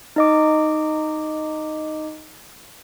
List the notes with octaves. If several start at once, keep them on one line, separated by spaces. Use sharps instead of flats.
D#4 D#5 D6